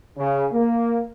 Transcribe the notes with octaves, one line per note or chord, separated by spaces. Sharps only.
C#3
A#3